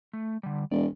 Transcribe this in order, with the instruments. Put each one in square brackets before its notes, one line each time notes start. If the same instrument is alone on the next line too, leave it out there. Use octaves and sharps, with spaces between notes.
[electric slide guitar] A3
D3 G3
[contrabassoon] E1 [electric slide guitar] D5